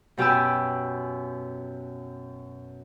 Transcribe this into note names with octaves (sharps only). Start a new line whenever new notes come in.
F#2 B2 G4 G#5 E6